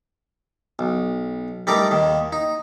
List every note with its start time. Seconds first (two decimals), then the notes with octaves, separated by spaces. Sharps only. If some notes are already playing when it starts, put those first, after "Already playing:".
0.79 B1
1.67 G3 A3 D#4 A#4 D5
1.91 D#2 D#3
2.32 D#4